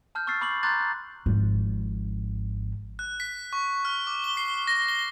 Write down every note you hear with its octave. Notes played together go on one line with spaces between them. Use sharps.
A5 F6 G6
C#6 E6 F6 A6 C7
B5 C#6 D6 C7 F#7
A#5 C6 D6 F#6 G6 A6
F#6
G#1 F3
F#6
B6
C#6
F6
D6
G7
C7
A#6
G7